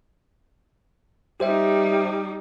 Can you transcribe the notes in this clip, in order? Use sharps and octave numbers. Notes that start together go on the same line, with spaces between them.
G3 D#4 G4 C5 E5